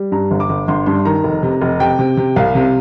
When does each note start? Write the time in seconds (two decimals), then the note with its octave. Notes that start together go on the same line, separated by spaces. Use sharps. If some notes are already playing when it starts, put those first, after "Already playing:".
Already playing: G3
0.12 G2 A#5
0.31 G1
0.40 D6
0.49 G1
0.68 G1 C6
0.86 G2 C6
1.05 D#3 A#5
1.24 F1
1.43 C3
1.61 F1
1.80 C3 G5
1.99 C3
2.17 C3
2.36 C2 F5
2.55 C3